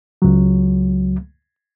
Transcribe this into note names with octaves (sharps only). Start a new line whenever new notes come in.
C#2 F#3